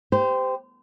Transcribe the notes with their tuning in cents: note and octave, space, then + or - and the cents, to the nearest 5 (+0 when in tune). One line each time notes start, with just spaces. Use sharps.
G4 +10 C5 -25